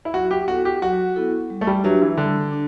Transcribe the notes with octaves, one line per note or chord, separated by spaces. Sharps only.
E4
F#3 F#4
G4
B3 E4 F#4 A4
G4
F#3 F#4
B3 E4 A4
G3
A3
G3
F#3 D4 G4 B4 E5
E3
D3 G3
D4